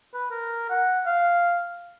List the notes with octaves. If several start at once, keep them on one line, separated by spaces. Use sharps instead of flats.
B4
A#4
F#5
F5